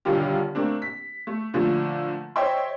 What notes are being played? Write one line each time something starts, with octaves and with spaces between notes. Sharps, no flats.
B1 G2 D3 D#3 F4 G4
A3 A#3 C4 D4
B6
A3
A#2 D3 F3 A3
C5 C#5 D#5 E5 G5 C6